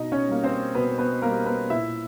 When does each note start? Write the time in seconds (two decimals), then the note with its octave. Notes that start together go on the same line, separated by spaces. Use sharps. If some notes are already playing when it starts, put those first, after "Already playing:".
Already playing: B2 D#4 D#5
0.12 C#4 C#5
0.28 G3 A#3
0.44 C4 C5
0.75 B2 B3 B4
0.98 B3 B4
1.22 G3 A#3 A#4
1.46 B3 B4
1.70 A#2 E4 E5